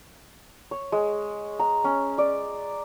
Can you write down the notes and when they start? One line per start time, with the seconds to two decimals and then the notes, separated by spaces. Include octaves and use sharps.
0.71 C#5
0.92 G#3
1.59 A#5
1.84 C#4
2.18 D5